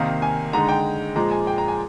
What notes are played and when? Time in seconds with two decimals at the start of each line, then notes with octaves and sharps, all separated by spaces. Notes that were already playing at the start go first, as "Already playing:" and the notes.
Already playing: C3 D#3 A#3 D#4 F5
0.22 G#5
0.53 D3 G#3 D#4 A#5
0.69 G5
1.16 A#2 F3 G#3 A#5
1.31 G#5
1.47 G5
1.58 A#5
1.68 G#5